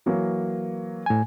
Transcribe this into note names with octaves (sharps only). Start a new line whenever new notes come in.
E3 F#3 A#3
A2 G#5